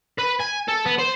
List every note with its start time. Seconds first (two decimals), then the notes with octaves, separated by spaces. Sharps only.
0.19 B4
0.41 G#5
0.68 A4
0.85 B3
0.98 C5